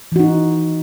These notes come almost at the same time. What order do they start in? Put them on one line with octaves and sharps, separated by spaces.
E3 F#4 D#4